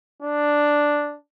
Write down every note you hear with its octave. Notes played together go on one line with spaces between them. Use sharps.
D4